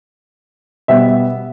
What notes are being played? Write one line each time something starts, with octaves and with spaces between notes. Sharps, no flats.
B2 G3 B3 E5